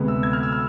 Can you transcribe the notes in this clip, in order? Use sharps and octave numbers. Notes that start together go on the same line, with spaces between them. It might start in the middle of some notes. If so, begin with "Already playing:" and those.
Already playing: D2 C3 G#3 B3
E6
G#6
F6
E6
F6